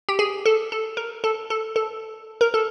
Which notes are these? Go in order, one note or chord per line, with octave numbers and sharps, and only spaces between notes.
G4
G#4
A4
A4
A#4
A4
A4
A4
A#4
A4